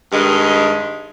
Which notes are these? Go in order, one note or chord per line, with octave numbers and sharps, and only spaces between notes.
G2 D#3 G#3